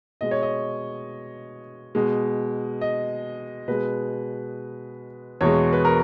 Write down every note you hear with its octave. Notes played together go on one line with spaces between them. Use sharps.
B2 G#3 D#5
C#5
D#5
B2 G#3
D#5
B2 G#3 B4
E2 B2 G#3 C#5
B4
A#4